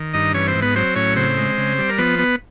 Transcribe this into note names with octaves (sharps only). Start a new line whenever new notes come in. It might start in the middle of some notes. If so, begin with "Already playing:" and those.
Already playing: D#3
G2 D#4 D#5
E3 C#4 C#5
C4 C5
G#2
B3 B4
F#3 C4 C5
A2 C#4 C#5
C#3 C4 C5
G#3
C#3
G3
A#4
F3 B3 B4
B3